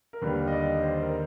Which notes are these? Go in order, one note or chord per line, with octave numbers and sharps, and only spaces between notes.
A#4
D#2 D3 G3 B4
D#5
D5
C5
A#4